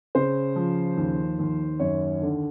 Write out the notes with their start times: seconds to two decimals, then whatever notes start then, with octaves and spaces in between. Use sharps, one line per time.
0.15 C#3 C5
0.56 F3
0.97 D#2
1.39 D#2
1.80 F#2 C#5
2.21 D3